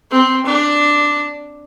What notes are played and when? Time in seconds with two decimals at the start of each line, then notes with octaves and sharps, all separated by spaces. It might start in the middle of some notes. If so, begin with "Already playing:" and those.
0.11 C4
0.46 D4